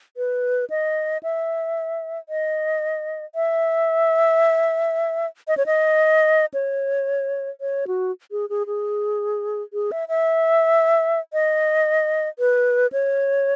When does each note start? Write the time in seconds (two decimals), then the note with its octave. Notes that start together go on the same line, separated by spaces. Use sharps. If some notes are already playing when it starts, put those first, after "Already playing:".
0.17 B4
0.70 D#5
1.23 E5
2.29 D#5
3.35 E5
5.48 D#5
5.57 C#5
5.66 D#5
6.54 C#5
7.61 C#5
7.87 F#4
8.31 G#4
8.50 G#4
8.67 G#4
9.73 G#4
9.92 E5
10.09 E5
11.33 D#5
12.39 B4
12.92 C#5